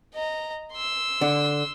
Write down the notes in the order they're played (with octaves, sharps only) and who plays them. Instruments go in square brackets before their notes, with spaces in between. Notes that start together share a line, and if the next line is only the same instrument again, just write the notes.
[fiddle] D#5 A#5
C6 E6
[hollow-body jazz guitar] D3